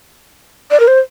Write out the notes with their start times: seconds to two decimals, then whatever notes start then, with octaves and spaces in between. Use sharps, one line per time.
0.71 D5
0.80 A#4
0.88 C5